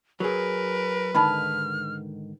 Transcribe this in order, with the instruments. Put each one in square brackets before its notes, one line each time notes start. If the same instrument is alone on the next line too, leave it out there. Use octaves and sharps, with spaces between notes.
[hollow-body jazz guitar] F#3 G#4 [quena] A#4 [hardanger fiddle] B4
[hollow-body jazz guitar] G#2 D3 D#3 [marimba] A5 B5 [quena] F6